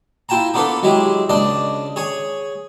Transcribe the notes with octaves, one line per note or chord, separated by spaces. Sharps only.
E4 F4 G5 A5 A#5
A#3 B3 D4 F4 A4 B4
F#3 G#3 E4 G4
C#2 D4 D5 D#5
G#4 C#5 G#5